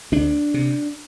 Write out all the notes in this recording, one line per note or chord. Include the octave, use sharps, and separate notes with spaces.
D2 D4
C3